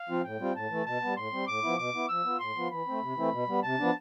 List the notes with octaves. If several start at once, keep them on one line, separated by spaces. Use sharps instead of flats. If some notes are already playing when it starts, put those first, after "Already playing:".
Already playing: F5
F3 C4 F4
A2 G5
G3 C4 F4
A2 A5
E3 A3
B2 A5
G3 B3
A2 C6
G3 C4
A2 D6
F3 B3 E4
B2 D6
B3 E4
F3 E6
B3 F4
A2 C6
F3 B3 F4
E3 B5
A3 C4
C3
E3 A3 C4 E4
B2
G3 B3
C3 A5
F3 B3 D4